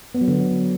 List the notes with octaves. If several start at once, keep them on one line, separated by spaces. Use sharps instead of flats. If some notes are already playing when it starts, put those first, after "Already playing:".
B3
F#3
D3
F#3